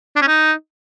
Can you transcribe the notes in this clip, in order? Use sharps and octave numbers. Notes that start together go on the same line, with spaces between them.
D4
C#4
D#4